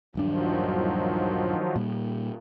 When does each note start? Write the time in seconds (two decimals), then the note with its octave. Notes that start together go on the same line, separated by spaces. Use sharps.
0.15 D#1 G2 D#3 F3 F#3 D4
1.76 A#2 G3